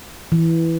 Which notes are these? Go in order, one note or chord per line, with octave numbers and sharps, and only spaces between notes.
E3